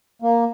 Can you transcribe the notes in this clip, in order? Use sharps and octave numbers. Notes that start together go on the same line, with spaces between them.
A#3